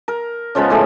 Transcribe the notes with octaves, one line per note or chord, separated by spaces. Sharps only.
A#4
C#3 F3 G#3 B3
A2 A3 G#4